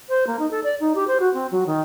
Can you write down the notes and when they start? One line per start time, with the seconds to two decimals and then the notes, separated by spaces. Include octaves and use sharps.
0.09 C5
0.27 A#3
0.39 D#4
0.51 A4
0.63 D5
0.80 D#4
0.95 G4
1.07 C5
1.20 F#4
1.34 C4
1.51 F#3
1.66 D#3